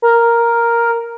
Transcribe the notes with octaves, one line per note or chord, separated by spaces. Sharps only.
A#4